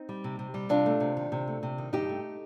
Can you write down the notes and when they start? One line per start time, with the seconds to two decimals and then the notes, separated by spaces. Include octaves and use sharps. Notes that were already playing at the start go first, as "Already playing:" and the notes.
Already playing: C4 D#4
0.09 G3
0.24 C3
0.39 C3
0.54 G3
0.69 C3 D4 F4
0.86 A3
1.00 C3
1.17 D#3
1.32 C3
1.48 A3
1.63 C3
1.78 D#3
1.93 G2 D#4 G4
2.09 A3